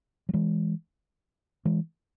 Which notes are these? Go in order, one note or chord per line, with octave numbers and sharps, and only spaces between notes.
F#3
E3 G#3
E3 G#3